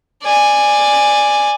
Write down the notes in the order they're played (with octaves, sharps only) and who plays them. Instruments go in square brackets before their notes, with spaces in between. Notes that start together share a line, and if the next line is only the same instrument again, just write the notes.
[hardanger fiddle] D5 G#5